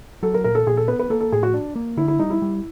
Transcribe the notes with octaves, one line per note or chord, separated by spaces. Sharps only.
F#3 A4
A#4
A#2 A#4
A4
A#2 G#4
A4
B3 B4
B4
A#3 A4
A4
A2 G#4
F#4
D4
A#3
D3 E4
E4
G3 D#4
E4
G3